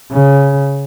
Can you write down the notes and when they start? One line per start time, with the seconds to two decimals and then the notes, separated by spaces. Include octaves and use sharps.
0.12 C#3